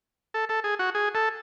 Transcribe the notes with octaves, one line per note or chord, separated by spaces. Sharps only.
A4
A4
G#4
F#4
G#4
A4